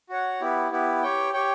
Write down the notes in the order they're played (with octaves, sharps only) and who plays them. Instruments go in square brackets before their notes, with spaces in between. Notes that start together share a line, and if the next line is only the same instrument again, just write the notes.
[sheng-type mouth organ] F#4 C#5 F#5
B3 E4 G4
B3 E4 G4
G4 C#5 G5
G4 C#5 G5